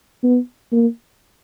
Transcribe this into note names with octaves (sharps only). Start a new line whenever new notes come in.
B3
A#3